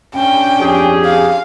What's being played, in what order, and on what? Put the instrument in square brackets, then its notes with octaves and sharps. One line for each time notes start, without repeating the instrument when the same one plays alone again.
[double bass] C#4 D4 [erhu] G5
[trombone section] F2 G4 G#4
[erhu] F5